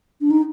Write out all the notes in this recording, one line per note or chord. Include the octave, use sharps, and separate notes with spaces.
D4
D#4